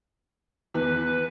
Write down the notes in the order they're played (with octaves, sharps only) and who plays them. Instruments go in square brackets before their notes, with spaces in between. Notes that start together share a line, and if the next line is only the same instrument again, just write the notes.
[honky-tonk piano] E2 [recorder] B4